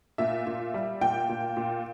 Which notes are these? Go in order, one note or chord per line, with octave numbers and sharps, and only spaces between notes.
A#2 E5
A#2
G3
A#2 G5
A#2
A#2